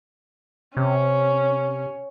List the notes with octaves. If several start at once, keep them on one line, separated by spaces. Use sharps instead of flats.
C3 C#4